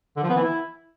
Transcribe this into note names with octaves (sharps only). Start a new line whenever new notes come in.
D3
F3
B3
E3
E4